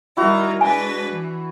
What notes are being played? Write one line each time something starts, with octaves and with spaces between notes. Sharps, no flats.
D#3 G3 E4 F#4 A#5
G#3 D4 B4 G#5
E3